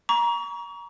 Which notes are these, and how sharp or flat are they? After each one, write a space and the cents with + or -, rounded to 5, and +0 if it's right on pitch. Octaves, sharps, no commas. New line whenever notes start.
A#5 +25 C#6 +35